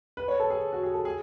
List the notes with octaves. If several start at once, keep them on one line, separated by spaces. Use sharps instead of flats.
B4
C#5
A4
G#4
F#4
G#4
A4
G#4